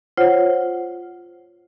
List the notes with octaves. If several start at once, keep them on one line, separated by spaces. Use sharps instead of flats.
F4 C5 C#5 F#5